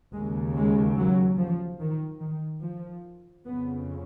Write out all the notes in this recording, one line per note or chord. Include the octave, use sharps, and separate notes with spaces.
D#2 C#3 G#3
G#3
F#3
F3
D#3
D#3
F3
F2 C#3 B3